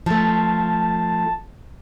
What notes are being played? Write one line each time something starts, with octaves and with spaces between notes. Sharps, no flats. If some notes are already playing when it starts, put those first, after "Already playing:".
F3 A3 A5